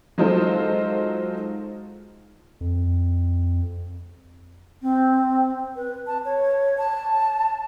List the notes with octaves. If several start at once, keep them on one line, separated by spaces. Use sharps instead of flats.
F#3 G#3 D#4 F4 A4 C5
F2
C4
B4
A5
C#5
A5